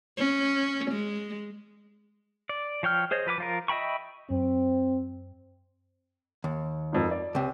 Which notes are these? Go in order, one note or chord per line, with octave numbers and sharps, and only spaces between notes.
C#4
G#3
D5
F3 C#5 G5 F6
G#4 C5 C#5 D#5
F3 B4 F5 D6
F3 F4 A#4
D#5 E5 G5 B5 C#6
F#2 C4
D#2
G#1 F2
D5
C#2 C3